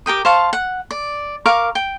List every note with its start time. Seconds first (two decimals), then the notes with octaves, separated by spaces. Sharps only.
0.06 G4 A#4 G5 D#6
0.25 C5 F5 A5 C#6
0.53 F#5
0.91 D5
1.46 A#4 F5 C#6 D6
1.75 G5